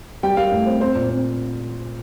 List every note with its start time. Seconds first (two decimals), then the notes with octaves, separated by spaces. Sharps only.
0.23 G3 G5
0.37 G3 F5
0.52 A2
0.66 C4
0.81 C4 C5
0.95 A#2
1.10 C4